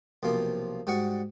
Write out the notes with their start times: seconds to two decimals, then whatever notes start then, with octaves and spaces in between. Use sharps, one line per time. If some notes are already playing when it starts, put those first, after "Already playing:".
0.23 B1 C3 F3 A#3
0.87 G#2 G3 F#4 D5 F#5 C#6